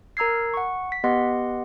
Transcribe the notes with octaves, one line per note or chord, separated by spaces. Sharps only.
A#4 A#5 E6 G#6 C7
F#5 C#6
B6
B3 G4 B4 D#5 F#5 C6